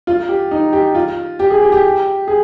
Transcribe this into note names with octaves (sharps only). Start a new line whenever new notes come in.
F4
G4
D#4
G4
F4
G4
G#4
G4
G4
G#4